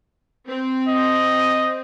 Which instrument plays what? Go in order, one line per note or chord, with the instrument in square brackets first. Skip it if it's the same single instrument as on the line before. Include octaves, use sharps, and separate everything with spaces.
[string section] C4
[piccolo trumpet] D#5